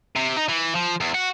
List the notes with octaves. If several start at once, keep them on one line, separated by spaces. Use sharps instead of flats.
C3
D#4
E3
F3
E2
F#4